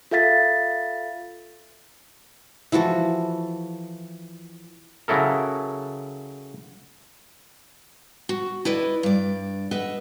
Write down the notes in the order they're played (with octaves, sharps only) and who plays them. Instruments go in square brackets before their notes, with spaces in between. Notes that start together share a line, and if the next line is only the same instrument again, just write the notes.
[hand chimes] F4 A4 E5 F5 A6 B6
[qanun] E3 F3 F#4 A4
[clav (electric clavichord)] C#3 F#3 E4 A4 A#4
[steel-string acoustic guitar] F#4
E4 B4 D5 D#5
G2 D5
B4 D#5 E5 F#5